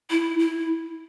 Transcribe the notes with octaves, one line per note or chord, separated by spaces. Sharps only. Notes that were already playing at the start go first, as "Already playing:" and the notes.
E4
E4